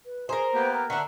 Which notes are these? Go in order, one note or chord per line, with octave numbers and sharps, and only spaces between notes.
B4
G#4 A#4 C5 A#5
A#3 B3 G4 G5
A#4 A#5
D3 D4 E5 F#5 C#6